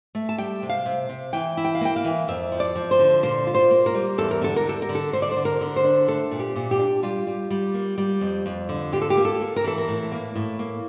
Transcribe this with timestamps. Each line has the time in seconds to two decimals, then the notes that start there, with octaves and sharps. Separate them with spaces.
0.15 A3
0.29 A5
0.38 G3 G5
0.62 C3
0.69 F5
0.86 C3
1.09 C3
1.33 E3 G5
1.57 E4
1.65 G5
1.75 F5
1.81 A#3 G5
1.96 F5
2.04 E3
2.28 F2 E5
2.52 F3
2.60 D5
2.75 F3
2.91 C5
2.99 D3
3.23 A#2 C5
3.47 F4
3.54 C5
3.71 A#3
3.86 A#4
3.94 G3
4.18 E2 A4
4.31 A#4
4.41 D3 A4
4.56 A#4
4.65 G3 A4
4.82 A#4
4.89 D3
4.95 A4
5.13 D3 C5
5.22 D5
5.32 D3 C5
5.45 A#4
5.61 D3
5.76 C5
5.84 D4
6.08 A3 A4
6.31 A#2
6.39 G4
6.56 A#2
6.71 G4
6.79 D4
7.03 G3 F4
7.27 G3
7.50 G3
7.74 A#3
7.98 G3
8.21 F2
8.46 F2
8.69 D3
8.92 F4 G4
9.02 A4
9.10 G4
9.17 A#3
9.25 A4
9.40 A#3
9.56 A#4
9.64 E3 A4
9.78 A#4
9.88 A2
10.12 A#3
10.36 A2
10.59 A#3